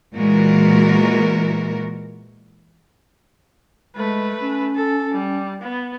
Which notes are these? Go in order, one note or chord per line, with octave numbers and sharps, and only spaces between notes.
A#2 E3 G#3 F#4 A#4
G#3 A3 B4
C#4
A4
G3
B3